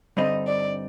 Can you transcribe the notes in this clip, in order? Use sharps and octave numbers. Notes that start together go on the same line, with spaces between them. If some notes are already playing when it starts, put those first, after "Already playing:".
G2 D3 G3 C4 D#4 D#5
D5